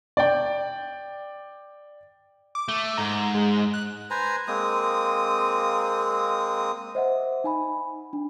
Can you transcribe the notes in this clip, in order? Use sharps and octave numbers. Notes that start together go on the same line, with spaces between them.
D5 G5
D6
A3
G#2 A#5
G#3
F#6
B4 C5 G#5 A#5
G#3 A#3 C4 D#6
C5 D#5 E5 F#5
D#4 G#5 B5
D4